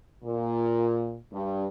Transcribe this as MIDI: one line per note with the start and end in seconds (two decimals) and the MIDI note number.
0.24 1.16 46
1.32 1.66 43